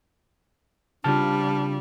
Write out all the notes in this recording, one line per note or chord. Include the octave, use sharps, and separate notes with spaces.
C#3 G3 C4 D4 F4 A5 F6